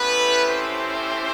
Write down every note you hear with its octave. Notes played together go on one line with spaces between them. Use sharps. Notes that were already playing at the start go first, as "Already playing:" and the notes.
Already playing: A3 B3 C#4 E4 G4 B4
C4 C5